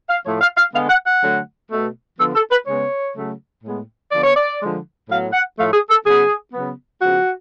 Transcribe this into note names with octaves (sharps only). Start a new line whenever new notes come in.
F5
A2 F3 A3 C#5
F5
F5
D3 G#3 B3 F5
F#5
F#5
D3 F#3 A3
B2 A3
D3 F3 B3 A4
A4
B4
C#3 G#3 B3 C#5
C#3 F#3 A3
A2 G#3 B3
D3 F3 B3 D5
C#5
D5
D3 F3 G#3
A2 F#3 B3 F5
F#5
A2 F3 A3 F5
G#4
A4
C#3 F#3 B3 G#4
C#3 F#3 B3
C#3 F3 B3 F#4